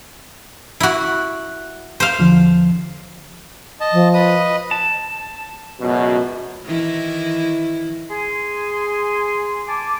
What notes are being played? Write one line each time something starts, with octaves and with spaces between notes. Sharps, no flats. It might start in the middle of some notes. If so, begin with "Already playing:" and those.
E4 F#4
C5 F5
E2 D3 F3
D#5 A5
F3
B4 D#5 D#6
A5
C#2 F#2 B2
D#3 E3 E4
G#4 G#5 C6
G#5 A5 D6